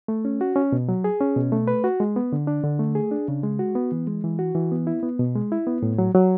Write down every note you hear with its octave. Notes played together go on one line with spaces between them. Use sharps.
A3
C#4
F#4
C#4
B2
F#3
G#4
C#4
B2
A3
B4
F#4
G#3
B3
D3
D4
D3
A3
G#4
D4
C#3
G#3
F#4
B3
E3
G#3
E3
F#4
E3
B3
E4
B3
B2
G#3
E4
B3
A2
F#3
F#3